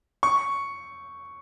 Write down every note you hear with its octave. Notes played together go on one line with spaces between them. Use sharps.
C#6